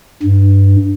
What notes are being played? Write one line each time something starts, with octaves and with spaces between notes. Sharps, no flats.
G2